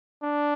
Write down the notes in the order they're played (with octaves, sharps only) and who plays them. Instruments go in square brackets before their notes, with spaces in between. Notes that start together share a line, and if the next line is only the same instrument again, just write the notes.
[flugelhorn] D4